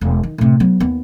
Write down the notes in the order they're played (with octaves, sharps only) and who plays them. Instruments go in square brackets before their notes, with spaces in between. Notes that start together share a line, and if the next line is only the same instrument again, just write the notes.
[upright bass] E1
D#3
A2 C3
F#3 B3
D#2 B3